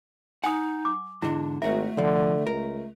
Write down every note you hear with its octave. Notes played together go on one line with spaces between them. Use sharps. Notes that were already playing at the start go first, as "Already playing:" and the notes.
D#4 F#5 G#5 D#6
D6
E2 G#2 D3 D4 E4 G#4
G#1 A3 F#4 A#4 E5
C2 D3 F3
C#2 A#4